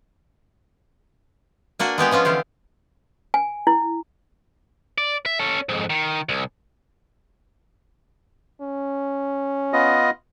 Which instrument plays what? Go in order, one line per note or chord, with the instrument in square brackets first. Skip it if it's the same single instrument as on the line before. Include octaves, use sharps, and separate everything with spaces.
[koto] A#3 D4 F#4 G#5
G#3 B3 G4 G#4
F3 B3 C#4 F4
D3 E3 G4 F5
[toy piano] G#5
E4
[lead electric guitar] D5
E5
C#4 A4
F2 G#2
D#3
C2
[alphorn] C#4
[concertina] B3 F4 D#5